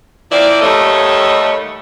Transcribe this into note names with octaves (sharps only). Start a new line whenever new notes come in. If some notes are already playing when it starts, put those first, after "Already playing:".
F3 A#3 C4 E4 D5
D#2 G3 A3 A4 C#5 D#5